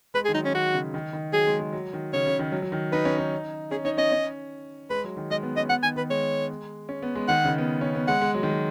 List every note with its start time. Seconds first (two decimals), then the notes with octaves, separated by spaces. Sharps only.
0.14 G#3 B4
0.25 G#4
0.29 D#3
0.34 F#3 D#4
0.45 C#4
0.54 D#3 F#4
0.74 C#3
0.94 D#3
1.13 D#3
1.33 F#3 G#4
1.47 G#3
1.60 G#3
1.73 F#3
1.93 D#3
2.13 C#3 C#5
2.27 C#3
2.39 D#3
2.52 F#3
2.62 F#3
2.72 D#3
2.92 D#4 B4
3.05 C#4
3.18 D#4
3.71 C#4 G#4
3.85 D#4 C#5
3.98 C#4 D#5
4.12 C#4
4.90 G#3 B4
5.04 F#3
5.17 D#3
5.31 G#3 D#5
5.43 B3
5.56 C#4 D#5
5.69 B3 F#5
5.83 D#3 G#5
5.96 D#3 B4
6.10 G#3 C#5
6.89 C#4
7.02 B3
7.15 G#3
7.28 D#3 F#5
7.44 C#3
7.48 D#3
7.58 B3
7.81 C#4
7.95 B3
8.07 G#3 F#5
8.22 G#3
8.34 F#3
8.43 D#3
8.50 F#3